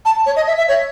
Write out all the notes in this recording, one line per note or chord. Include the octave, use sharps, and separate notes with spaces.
A5
C#5
D#5
E5
E5
C#5